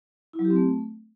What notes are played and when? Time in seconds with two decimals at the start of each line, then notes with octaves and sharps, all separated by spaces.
0.33 E4
0.39 F#3
0.45 G4
0.50 C4
0.56 A3